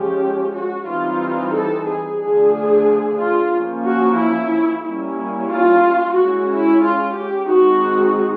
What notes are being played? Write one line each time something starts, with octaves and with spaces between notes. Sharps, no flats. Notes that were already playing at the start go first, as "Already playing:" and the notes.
Already playing: F3 G#3 C#4 G4
F#4
E3 G3 C4 D#4 F4
A4
G#4
D3 F3 A3 D4 G#4
F4
F3 A#3 C#4
F#4
E4
G3 A#3 C#4 E4
F4
G#3 C#4 E4 F#4
E4
F4
G4
D#3 G#3 C4 D#4 F#4